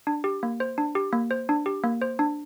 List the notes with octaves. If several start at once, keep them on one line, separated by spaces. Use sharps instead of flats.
D4
G4
A#3
C5
D4
G4
A#3
C5
D4
G4
A#3
C5
D4